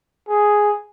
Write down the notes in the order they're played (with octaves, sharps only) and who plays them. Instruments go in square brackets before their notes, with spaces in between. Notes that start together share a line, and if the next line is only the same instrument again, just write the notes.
[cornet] G#4